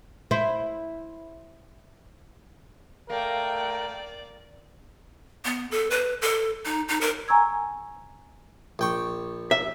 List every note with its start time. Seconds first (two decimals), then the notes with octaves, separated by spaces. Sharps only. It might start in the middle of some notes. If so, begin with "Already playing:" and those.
0.31 E4 C5
3.10 A3 A#3 A#4 D5 G5
5.45 B3
5.71 A4
5.90 B4
6.22 A4
6.65 D#4
6.88 D#4
7.01 A#4
7.28 G#5 A#5 C#6 E6 G#6
8.79 A#1 G5 C#6
9.51 E5